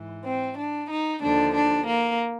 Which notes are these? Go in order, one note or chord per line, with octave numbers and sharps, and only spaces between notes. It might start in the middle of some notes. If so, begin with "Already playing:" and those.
Already playing: G#2 E3
C4
D4
D#4
D#2 D3 F3 D4
D4
A#3